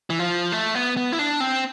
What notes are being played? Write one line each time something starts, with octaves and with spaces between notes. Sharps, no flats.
E3
F3
A3
B3
B3
E4
D4
C4